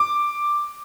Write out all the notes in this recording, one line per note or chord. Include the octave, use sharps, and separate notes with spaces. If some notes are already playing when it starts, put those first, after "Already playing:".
Already playing: D6